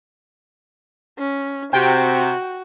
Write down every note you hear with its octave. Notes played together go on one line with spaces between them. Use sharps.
C#4
C3 F#4 G5